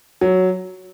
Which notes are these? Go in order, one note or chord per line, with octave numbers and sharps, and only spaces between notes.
F#3